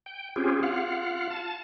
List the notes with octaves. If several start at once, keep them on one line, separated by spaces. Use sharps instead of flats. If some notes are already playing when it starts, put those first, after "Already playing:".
G5
C4 C#4 F4 G4 G#4
F4 F5 F#5
A5